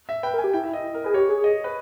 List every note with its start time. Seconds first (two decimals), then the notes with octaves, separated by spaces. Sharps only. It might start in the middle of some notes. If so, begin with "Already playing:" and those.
0.09 E5
0.23 B4 G5
0.34 A#4
0.38 G#5
0.44 G4
0.54 E4 G5
0.64 E5
0.73 D#5
0.94 A#4
1.04 G#4 B4
1.14 G4 C#5
1.29 G#4
1.44 D#5
1.64 B4